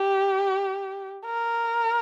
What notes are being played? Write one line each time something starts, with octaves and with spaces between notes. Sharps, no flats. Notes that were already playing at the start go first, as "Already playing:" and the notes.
Already playing: G4
A#4